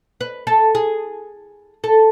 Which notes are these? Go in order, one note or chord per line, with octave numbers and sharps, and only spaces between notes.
B4
A4
G#4
A4